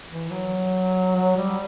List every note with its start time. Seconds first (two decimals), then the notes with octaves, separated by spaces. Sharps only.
0.09 E3
0.30 F#3
1.15 F#3
1.37 G3